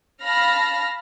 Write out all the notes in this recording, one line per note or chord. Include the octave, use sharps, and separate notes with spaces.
F5 A5 B5 F6 A#6